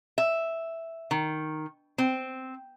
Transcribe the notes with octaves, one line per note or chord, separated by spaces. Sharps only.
E5
D#3
C4